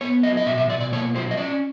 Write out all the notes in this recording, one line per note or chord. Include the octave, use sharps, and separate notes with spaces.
B3 C#5
F#3 D#5
D#5
B2 E5
E5
B2 D5
D5
A#3 C#5
F#3 C5
D#5
C#4 D5